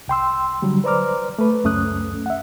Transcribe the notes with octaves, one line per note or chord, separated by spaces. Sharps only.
C2 G5 C6 E6
D3 F#3 G3
B4 C5 D5 A#5 D6 F6
A3 B4
C#2 F#2 A3 C#4 D#6 F#6
E5 F#5